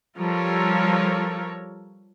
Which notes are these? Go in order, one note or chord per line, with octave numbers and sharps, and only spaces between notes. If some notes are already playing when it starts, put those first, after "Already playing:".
F3 G3 F4 A4 A#4 C#5